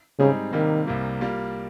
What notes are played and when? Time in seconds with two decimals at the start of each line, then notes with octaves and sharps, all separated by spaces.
0.19 G#2 C#3 G3 C4 D#4 G#4
0.53 C3 D#3 G3 A#3
0.87 C2 C3 G3 A#3
1.21 G3 A#3 F4